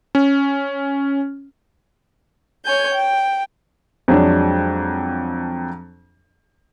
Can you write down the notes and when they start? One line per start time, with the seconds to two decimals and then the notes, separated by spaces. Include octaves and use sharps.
0.15 C#4
2.65 C#5 G#5 G6
2.94 G5
4.08 F2 F#3 G#3 D4